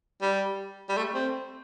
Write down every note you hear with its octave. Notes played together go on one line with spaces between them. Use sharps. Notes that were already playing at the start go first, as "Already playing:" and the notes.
G3
G3
A3
C4